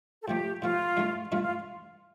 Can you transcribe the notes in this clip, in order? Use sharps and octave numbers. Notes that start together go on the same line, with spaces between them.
A4
A2 F3 A3 G4
A2 F3 A3 F4
G2 E3 A3
G2 E3 A3 F4
F4